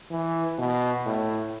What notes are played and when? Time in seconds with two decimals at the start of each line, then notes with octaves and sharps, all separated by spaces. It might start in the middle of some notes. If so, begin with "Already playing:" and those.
0.11 E3
0.58 B2
1.06 A2